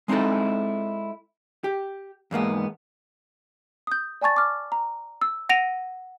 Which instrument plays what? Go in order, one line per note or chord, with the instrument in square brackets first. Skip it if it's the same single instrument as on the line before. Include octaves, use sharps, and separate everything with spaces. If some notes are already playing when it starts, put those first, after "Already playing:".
[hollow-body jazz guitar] G#3 C4 D#4 E4 A4
G4
E2 G#2 A#3 B3
[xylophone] D#6 G6
D5 G#5 A5 C#6 A6
D6 F6
A#5
E6
F#5 A#6 D7 D#7 F7